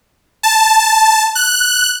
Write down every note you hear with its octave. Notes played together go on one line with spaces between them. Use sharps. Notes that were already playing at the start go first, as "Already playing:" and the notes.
A5
F#6